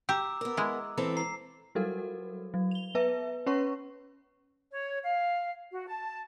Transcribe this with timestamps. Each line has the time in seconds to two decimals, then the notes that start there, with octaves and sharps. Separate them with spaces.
0.09 G4 A#5 D6 E6
0.41 B3 A#4
0.57 G#3 E4
0.97 E3 C4 A4
1.17 A#5 C7
1.75 F#3 G3 F#4 A4 A#4
2.54 F#3
2.71 F7 G7
2.95 B3 B4 E5
3.46 C#4 B4 C#5 C#6
4.71 C#5
5.02 F5
5.72 F#4
5.87 A5